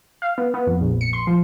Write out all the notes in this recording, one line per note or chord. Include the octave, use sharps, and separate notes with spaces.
F5
B3
B3
F2
A#1
C#7
C6
F3